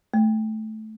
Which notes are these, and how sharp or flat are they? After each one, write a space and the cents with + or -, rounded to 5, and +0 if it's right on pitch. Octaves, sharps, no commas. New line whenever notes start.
A3 -15